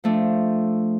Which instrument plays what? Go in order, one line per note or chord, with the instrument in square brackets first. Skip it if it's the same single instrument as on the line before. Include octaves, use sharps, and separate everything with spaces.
[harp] F3 A3 D4